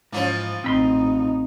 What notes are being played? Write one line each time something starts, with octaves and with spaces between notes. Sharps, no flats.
G#2 E3 F3 C#4
A1 C4 D#4 B5 C6